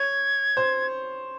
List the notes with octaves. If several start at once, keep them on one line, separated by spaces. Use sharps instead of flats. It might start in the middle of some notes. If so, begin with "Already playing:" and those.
Already playing: C#5 G#6
C5